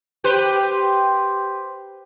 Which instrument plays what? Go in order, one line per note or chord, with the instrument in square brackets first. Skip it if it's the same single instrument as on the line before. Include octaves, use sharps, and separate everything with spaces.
[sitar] G4 B4 C5